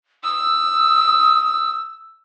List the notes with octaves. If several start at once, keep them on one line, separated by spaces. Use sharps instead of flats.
D#6 E6